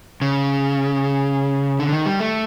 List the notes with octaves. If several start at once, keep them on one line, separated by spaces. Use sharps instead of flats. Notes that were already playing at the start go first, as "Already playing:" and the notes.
C#3
D3
D#3
G3
A3